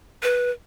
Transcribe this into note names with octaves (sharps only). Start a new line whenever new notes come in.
B4